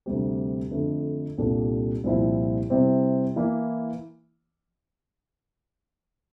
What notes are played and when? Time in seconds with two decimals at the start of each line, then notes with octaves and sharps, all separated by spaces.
0.06 D2 C3 G3 C4 G4
0.71 F2 D3 A3
1.38 C2 A#2 G3 D4 A4
2.04 C2 A#2 F3 C4 E4
2.70 C3 G3 C4 E4
3.36 E3 A#3 E4